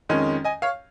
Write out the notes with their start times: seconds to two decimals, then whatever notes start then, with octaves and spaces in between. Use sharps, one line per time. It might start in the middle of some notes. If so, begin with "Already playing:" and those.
0.09 F2 D#3 G#3 C#4
0.44 D#5 G#5
0.62 C#5 F5